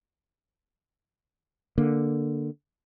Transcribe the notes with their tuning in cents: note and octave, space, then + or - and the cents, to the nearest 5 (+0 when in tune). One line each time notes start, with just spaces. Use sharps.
D3 +0 A#3 +0